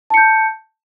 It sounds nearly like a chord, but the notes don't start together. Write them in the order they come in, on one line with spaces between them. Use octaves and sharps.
A5 C#7 G6